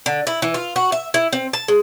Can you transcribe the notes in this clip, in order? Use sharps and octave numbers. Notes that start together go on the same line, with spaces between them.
D3
E4
E3
F4
F#4
E5
E4
C4
A5
G#3